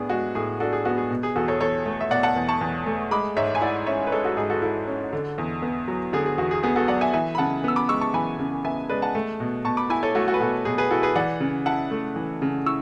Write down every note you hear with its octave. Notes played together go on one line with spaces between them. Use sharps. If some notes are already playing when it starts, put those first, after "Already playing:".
Already playing: A2 B3 D4 G#4
G#3 F#4
A2 G#4
D4 F#4 A4
G#4
B3 F#4
G#4
B2
G#4
E2 F#4 A4
A4 C#5
E2 A4 C#5
A3
E5
B2 D5 F#5
F#5 A5
E2
A5 C#6
E2
A3
G#3 B5 D6
G#2 C#5 E5
G#5
E4 D5 F#5
C#4 C#5 E5
B4
G#3 A4 C#5
F#4 A4
G#2 G#4
F#4 A4
E4 F#4 A4
C#4
D3
E2
B3
F#3
D3 G#4
G#4
E2 F#4
G#4
B3 G#4
F#4 A4
F#3 D5 F#5
E5 G#5
E3 E5 G#5
B5
C#3 F#5 A5
B3 E6
B5 D6
G#3 C#6 E6
A5 C#6
E3 G#5 B5
C#3
B3 E5 G#5
G#3 B4 D5
F#5 A5
A3
B2
B2 A5 C#6
B5 D6
E4 G#5 B5
A4 C#5
A3 F#4 A4
F#4 A4
B4
B2 F#4 A4
B2 G#4
G#4 B4
E4 F#4 A4
G#4 B4
E3 D5 F#5
C#3
E4 F#5 A5
A3
E3
C#3
E4 C#6 E6